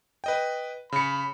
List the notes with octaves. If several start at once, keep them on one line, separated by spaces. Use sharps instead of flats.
B4 D#5 G5
C#3 B5 C#7